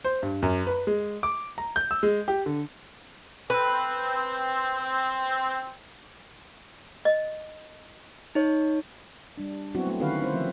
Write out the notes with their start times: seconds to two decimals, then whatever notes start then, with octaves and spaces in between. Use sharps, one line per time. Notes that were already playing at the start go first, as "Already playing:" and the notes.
0.04 C5
0.23 G2
0.42 F#2
0.67 B4
0.87 G#3
1.23 D6
1.58 A#5
1.76 G6
1.91 E6
2.03 G#3
2.28 G4
2.46 D3
3.50 C4 B4
7.05 D#5
8.35 D#4 C#5
9.37 G3 D4
9.75 F#3 B3 C4 E4 F#4
9.87 A3 F#4
10.00 D3 D#3 C#4 F#4 B4 F5
10.21 C4 E4 C5
10.34 F3 C4 E5